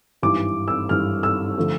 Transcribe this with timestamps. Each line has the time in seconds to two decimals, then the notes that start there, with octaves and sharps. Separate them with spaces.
0.22 G#1 G2 E3 D6
0.68 E6
0.89 G#1 G2 E3 F6
1.23 E6
1.58 D3 F3 A3